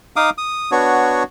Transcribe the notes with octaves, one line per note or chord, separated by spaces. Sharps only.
D#4 F5 D6 D#6
D#6
B3 D4 F#4 C#5